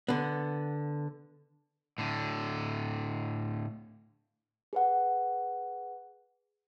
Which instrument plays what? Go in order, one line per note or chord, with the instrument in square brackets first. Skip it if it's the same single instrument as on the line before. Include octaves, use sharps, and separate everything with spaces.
[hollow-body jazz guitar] D3 B3
[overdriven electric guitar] A2 D3
[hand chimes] G#4 B4 F#5